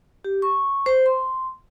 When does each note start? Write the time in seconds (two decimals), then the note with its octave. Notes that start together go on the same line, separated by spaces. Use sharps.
0.24 G4
0.42 C#6
0.86 C5
1.06 C6